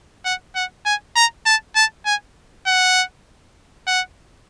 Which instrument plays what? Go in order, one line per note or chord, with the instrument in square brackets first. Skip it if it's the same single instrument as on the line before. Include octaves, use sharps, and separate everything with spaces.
[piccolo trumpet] F#5
F#5
G#5
A#5
A5
A5
G#5
F#5
F#5